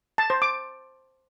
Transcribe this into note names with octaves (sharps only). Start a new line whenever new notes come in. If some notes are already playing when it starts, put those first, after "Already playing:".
A5
C5
D6